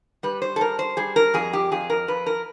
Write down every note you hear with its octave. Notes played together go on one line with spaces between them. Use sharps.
G3 B4
C5
A4
G3 A#4
C5
G3 G#4
A#4
F2 G#4
G4
F2 G#4
A#4
F2 B4
A#4